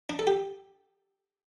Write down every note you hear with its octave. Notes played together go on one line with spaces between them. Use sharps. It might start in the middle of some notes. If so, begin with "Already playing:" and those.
D4
A4
G4